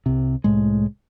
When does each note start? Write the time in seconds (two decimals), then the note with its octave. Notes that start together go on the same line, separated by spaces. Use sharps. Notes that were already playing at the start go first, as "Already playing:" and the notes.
0.06 C2 C3
0.44 C2 A2 G#3